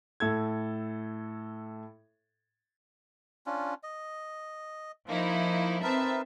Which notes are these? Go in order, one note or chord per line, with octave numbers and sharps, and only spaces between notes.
A2 A4 G#6
C#4 D4 F4
D#5
F3 A#3 D#4 E4
C4 D#4 A#4 B4 E5 A5